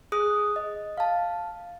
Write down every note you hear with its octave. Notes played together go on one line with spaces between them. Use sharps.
G#4 D#6 F#6
D#5
F5 A5